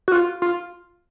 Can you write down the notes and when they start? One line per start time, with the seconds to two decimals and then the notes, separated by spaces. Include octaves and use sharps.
0.08 F#4
0.12 F4
0.42 F4